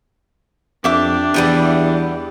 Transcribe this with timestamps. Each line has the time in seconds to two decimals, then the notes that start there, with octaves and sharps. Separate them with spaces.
0.84 F2 D4 G4 E5 D6
1.34 E2 E3 G3 B3